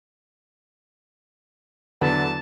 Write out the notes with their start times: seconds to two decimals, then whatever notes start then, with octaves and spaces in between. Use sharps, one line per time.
2.01 E2 D3 F#3 B4 A5